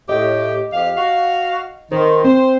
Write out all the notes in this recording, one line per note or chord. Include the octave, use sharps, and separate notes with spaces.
A2 G4 D#5
F2 G4 F5
F#4 F5
D#3 C5
C4 C5